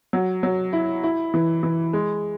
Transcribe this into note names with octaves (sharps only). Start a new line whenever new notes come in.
F#3
F#3
E4
E4
E3
E3
G#3